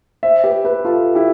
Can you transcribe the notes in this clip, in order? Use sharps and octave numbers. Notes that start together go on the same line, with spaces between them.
C5 E5
G4 B4
G4 B4
F4 A4
E4 G4